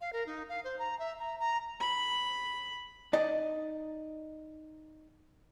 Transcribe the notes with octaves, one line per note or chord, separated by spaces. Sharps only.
F5
A#4
D#4
F5
C5
A#5
E5
A#5
A#5
B5
D#4 D5 D#5